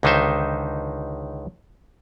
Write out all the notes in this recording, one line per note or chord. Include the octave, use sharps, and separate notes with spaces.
C#2 D3 D#3 D#4 C5 E5